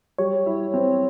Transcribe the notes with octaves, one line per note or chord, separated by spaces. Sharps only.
G3 C#5
E4
C4